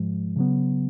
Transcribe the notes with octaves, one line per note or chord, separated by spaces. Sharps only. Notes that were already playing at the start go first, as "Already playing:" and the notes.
Already playing: G#2 F3 G#3
C#3 F#3 B3